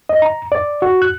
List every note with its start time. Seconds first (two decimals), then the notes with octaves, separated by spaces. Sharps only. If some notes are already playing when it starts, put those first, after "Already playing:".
0.09 D#5
0.22 A#5
0.52 D5
0.82 F#4
1.02 F#6